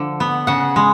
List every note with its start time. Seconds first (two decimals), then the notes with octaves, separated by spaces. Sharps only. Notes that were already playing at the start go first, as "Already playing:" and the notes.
Already playing: D3 F3
0.20 B3
0.47 C#3 F#5
0.76 G#3